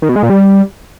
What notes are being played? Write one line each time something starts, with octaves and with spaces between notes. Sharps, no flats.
D#3
B2
G#3
A#2
G3